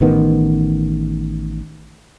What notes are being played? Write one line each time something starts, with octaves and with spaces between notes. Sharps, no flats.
A1 D#3 B3